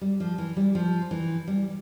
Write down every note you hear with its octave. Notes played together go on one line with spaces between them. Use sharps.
G3
F3
E3
G3
F3
E3
G3